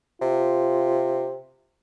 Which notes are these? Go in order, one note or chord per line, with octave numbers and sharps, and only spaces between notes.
C3 F4